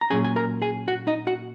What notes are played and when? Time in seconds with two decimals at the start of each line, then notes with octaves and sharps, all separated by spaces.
0.01 A#5
0.10 A#2 F#3 C#4 G#4 G#5
0.24 G#5
0.36 A#4 A#5
0.62 G#4 G#5
0.88 F#4 F#5
1.07 D#4 D#5
1.27 F#4 F#5